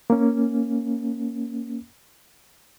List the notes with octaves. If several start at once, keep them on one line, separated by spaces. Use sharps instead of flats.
A#3 C#4